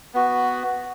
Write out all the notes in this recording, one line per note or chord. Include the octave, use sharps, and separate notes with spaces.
B3 F#4